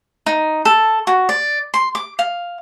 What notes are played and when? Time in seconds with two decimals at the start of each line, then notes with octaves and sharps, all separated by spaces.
0.26 D#4
0.65 A4
1.07 F#4
1.29 D5
1.74 C6
1.95 D6
2.19 F5